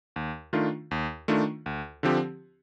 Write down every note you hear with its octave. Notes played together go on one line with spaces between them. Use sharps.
D#2
D#3 A3 D4 F4
D#2
D#3 A3 D4 F4
D2
D3 F3 C4 G4